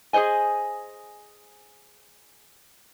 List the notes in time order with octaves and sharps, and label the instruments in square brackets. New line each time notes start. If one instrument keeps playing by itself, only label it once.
[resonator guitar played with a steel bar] G#4 A4 C5 D#5 G#5